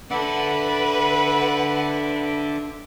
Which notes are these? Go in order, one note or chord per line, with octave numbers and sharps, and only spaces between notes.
D4 A4 B4 E5 F#5 D6